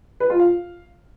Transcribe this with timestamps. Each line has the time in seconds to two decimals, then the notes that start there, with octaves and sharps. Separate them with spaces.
0.20 B4
0.30 F4
0.39 F5